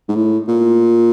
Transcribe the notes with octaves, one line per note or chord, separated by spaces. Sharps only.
G#2
A2
A#2